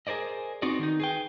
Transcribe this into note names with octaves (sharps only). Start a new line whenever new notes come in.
G#4 A#4 C5 D5 D#5
B3 C4 D#4 F#4 D5
D#3 D4 D#4
G#4 B4 G5